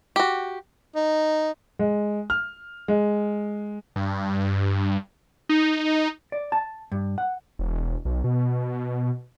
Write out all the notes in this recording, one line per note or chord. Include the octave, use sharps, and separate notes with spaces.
F#4 G4
D#4
G#3
F6
G#3
G2
D#4
D5
A5
G2
F#5
E1
B1
B2